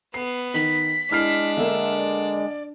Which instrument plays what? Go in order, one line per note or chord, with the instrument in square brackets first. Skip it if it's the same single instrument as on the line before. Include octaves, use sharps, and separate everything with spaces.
[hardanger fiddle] B3 [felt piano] C7
[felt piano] D#3 [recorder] B6
[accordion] G#3 [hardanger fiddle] D4 [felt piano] E4 F6 C7
[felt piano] D3 A#3 [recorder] E5
[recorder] D5